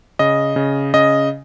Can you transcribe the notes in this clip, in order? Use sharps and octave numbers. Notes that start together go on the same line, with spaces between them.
C#3 D#5
C#3
C#3 D#5